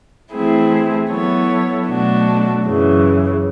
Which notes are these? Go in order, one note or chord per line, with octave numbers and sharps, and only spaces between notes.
E3 A3 C4 E4 G#4
F#3 B3 E4 A4 C#5
B2 F#3 A3 D4 F#4
F#2 C#3 E3